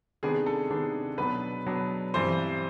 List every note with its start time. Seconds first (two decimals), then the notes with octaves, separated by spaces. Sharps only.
0.23 C3 D#3 G#3 B3 D4 G#4
0.46 A4
0.70 C3 D#3 G#3 B3 D4
1.18 B2 F#3 B3 D4 B4
1.66 B2 F#3 B3 D4
2.14 G2 E3 G3 C4 C5